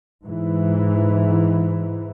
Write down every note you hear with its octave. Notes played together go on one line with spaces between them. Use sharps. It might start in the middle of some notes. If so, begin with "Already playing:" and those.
G#2 E3